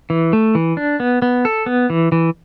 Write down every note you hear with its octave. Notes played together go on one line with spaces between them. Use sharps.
E3
A3
E3
D4
B3
B3
A4
B3
E3
E3